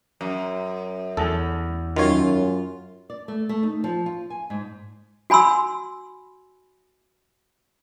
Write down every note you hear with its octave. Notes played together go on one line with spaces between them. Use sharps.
F#2
E2 A4
F#2 D#3 F4 C#5
D5
A3
A3
D#4
F3
F4
G#5
G#2
F#4 G#5 B5 C6 E6